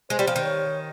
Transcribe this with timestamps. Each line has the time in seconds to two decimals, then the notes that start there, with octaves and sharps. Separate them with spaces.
0.10 G#3 C5
0.19 G3
0.27 F3
0.36 D#3
0.45 C#5